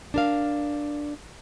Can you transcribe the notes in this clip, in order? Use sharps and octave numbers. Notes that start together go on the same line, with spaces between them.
D4 A#4 F5